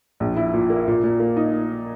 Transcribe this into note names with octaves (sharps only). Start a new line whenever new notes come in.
A#1
E4
A#2
A#3
A#2
A#2
A#3
D#4